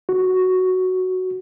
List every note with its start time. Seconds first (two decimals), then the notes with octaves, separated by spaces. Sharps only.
0.09 F#4